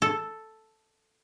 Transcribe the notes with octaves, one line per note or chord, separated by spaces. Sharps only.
A4